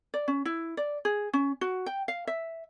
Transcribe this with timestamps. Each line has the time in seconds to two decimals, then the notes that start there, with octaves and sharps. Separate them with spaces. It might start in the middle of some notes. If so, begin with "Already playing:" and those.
0.14 D5
0.28 C#4
0.45 E4
0.77 D5
1.05 G#4
1.33 C#4
1.61 F#4
1.86 G5
2.08 F5
2.27 E5